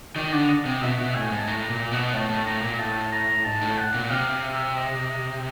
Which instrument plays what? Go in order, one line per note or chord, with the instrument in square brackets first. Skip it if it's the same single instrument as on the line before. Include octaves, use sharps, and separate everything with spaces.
[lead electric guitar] D#3 [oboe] D5
[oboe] D#5
[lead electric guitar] D3 [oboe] D5
[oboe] D#5
[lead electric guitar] C3
[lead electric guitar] B2 [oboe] E5
[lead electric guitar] B2
[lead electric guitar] A2 [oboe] G#5
[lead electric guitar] G#2
[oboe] A5
[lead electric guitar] A2 [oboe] A#5
[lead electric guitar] A#2
B2
[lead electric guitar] A2 [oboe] A5
[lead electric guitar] A2
[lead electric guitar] A2 [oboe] A#5
[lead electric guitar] A#2
[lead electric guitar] A2 [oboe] A5
[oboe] A#5
[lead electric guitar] G#2 [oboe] A5
[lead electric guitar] A2
[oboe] F#5
[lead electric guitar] A#2
[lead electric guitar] C3 [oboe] F5
[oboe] E5
D#5